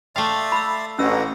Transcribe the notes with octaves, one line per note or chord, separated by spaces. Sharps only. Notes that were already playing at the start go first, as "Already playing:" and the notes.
A3 D5 E5 F5 G5 C6
B5 E6
A1 C#4 E4 F#4 D#5 E6